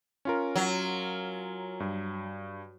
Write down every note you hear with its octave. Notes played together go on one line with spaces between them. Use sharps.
C#4 F4 A#4
F#3
G2